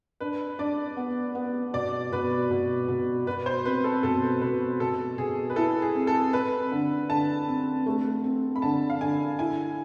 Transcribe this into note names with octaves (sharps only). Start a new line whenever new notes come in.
D4 B4
D4 D5
B3
B3
B2 D5
B2 B4
B2
B2
B2 B4
C5
C4 B4
A4
B2 A4
B2 B4
B2 A4
B2 G#4
B4
E4 A4
G#4
C4
A4
C4 B4
D3
D3 A5
C4
A3
C4
B5
D3 A5
F5
D3 G#5
E4 G#5